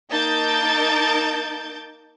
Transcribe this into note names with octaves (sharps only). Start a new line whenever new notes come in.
A#3 D#4 A5 G6 A6 D7